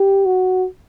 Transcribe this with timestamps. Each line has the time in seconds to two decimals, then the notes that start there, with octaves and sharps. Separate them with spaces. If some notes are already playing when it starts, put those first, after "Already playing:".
Already playing: G4
0.26 F#4